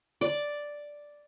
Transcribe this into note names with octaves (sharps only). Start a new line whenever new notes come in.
D5